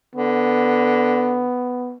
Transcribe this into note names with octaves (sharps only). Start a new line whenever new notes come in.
D3 B3